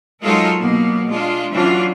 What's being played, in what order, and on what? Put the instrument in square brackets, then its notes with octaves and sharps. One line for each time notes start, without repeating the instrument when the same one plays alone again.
[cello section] F#3 G#3 D#4 F4 A4 A#4
B2 F#3 A#3 B3
G#3 D4 F4
E3 F#3 C#4 D4 F4 F#4